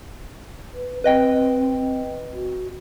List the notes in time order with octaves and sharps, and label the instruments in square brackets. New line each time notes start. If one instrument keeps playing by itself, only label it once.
[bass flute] B4
[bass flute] C4 [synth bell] B4 D#5 G5
[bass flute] F#4